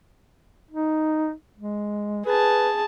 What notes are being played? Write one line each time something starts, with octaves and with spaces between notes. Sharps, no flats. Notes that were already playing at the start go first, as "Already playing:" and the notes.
D#4
G#3
G#4 B4 A5